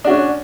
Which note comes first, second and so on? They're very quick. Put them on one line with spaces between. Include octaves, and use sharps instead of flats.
D4 F#4 C#4